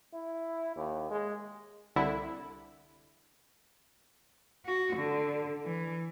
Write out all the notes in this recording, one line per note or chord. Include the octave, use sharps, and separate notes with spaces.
E4
D#2
G#3
C2 D3 E4
F#4
D3
E3